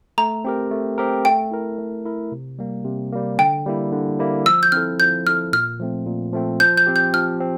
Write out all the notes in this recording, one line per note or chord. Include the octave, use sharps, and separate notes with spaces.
A3 A#5
C4 G4 A#4
A3
C4 G4 A#4
A3 G5
E4 A#4
A3
E4 A#4
C3
G3 A#3
C3
G3 A#3
D3 G5
G3 A#3 E4
D3
G3 A#3 E4
F3 E6
G6
C4 E4 A4 F6
F3 G6
C4 E4 A4 F6
A#2 F6
F3 A3 C4
A#2
F3 A3 C4
F3 G6
G6
C4 G4
G6
F3 F6
C4